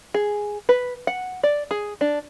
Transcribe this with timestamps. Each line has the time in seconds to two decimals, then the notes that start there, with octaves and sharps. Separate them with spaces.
0.14 G#4
0.69 B4
1.07 F#5
1.43 D5
1.71 G#4
2.01 D4